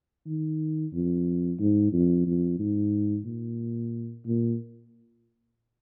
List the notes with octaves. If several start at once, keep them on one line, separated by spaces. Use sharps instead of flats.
D#3
F2
G#2
F2
F2
G#2
A#2
A#2